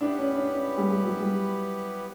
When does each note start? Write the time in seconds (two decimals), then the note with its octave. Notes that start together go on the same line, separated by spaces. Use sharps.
0.01 B3 D4 E4 G4 B4
0.18 C#4
0.34 D4
0.52 C#4
0.78 G3
0.91 G3
1.03 F#3
1.20 G3